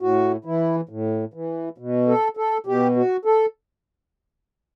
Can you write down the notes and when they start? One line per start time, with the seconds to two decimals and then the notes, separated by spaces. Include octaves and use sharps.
0.01 A2 F#4
0.45 E3 E4
0.89 A2
1.34 E3
1.78 B2
2.08 A4
2.37 A4
2.66 B2 G4
2.96 F#4
3.25 A4